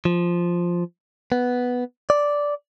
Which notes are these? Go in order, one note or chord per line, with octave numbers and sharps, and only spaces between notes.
F3
B3
D5